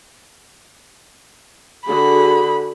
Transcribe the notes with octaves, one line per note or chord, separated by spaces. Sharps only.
D3 F#4 G#4 B5